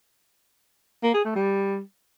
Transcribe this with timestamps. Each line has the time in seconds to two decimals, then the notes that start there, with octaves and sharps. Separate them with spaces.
1.03 A#3
1.14 G#4
1.25 A3
1.35 G3